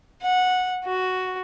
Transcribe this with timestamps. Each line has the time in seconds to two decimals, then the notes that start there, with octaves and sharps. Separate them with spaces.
0.23 F#5
0.85 F#4